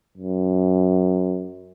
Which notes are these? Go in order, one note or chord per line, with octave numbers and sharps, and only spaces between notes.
F#2